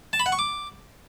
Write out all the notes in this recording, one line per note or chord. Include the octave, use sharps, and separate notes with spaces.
A5
B5
F#5
C#6
D6